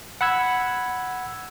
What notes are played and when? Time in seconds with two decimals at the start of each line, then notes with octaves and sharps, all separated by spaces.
0.21 F#5 B5 E6 G#6